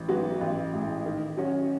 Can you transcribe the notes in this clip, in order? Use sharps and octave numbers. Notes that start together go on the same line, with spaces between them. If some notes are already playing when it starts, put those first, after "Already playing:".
Already playing: A1
G#2 F#3 B3 F#4
A1
A2 G#3
D#3
F#3 C#4 F#4 C#5